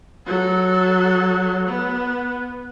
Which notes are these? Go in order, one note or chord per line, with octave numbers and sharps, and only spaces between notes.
F#3 A4
B3